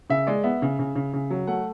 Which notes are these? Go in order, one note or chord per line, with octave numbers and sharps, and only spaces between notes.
C#3 E5
G#3 D5
B3 E5
C#3
C#3
C#3
C#3
F#3
A3 F#5